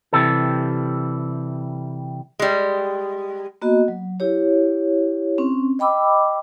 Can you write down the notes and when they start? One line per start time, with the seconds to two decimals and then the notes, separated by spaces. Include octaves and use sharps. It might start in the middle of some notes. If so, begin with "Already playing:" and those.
0.13 C3 E3 G3 A4
2.39 G3 G#3
3.62 A#3 B3 F#4 D#5
3.88 F#3
4.20 E4 G4 C#5
5.38 C4 C#4
5.79 D#5 G5 B5 D6 E6